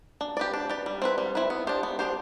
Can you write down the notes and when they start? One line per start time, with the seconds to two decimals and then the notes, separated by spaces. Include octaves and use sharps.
0.21 D4
0.37 G4 B4 D5
0.54 D4
0.69 G4 B4 D5
0.86 G3
1.02 C4 E4 B4
1.18 G3
1.35 C4 E4 B4
1.50 B3
1.67 D4 G4 C5
1.83 B3
1.99 D4 G4 C5